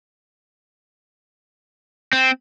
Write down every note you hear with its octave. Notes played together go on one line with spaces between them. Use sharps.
C4